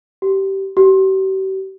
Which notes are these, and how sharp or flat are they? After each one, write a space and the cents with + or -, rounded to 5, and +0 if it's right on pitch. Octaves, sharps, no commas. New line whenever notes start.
G4 -20
G4 -40